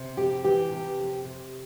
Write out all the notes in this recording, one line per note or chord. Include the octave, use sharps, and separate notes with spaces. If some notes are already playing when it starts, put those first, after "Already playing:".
Already playing: C3
F2 G4
E3 G4
C3
F2
C3